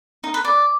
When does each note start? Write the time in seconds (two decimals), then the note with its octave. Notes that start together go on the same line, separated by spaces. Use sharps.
0.24 D#4
0.34 B4
0.45 D5